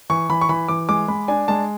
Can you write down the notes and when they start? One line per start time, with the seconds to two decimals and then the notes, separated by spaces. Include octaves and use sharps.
0.10 E3 C#6
0.29 E3 B5
0.41 C#6
0.49 E3 B5
0.68 E3 D6
0.89 G#3 D6
1.08 G#3 B5
1.28 D4 G#5
1.48 G#3 A5